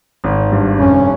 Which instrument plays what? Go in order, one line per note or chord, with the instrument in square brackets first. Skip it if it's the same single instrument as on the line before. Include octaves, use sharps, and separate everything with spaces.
[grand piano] G#1
G2
[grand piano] F1 [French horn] C#4